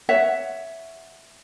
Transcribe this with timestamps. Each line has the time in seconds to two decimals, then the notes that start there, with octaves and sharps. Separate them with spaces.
0.09 C#5 E5 F#5